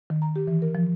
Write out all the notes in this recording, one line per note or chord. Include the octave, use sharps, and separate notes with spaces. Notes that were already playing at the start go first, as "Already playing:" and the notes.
D#3
A#5
G4
E3
A#4
F3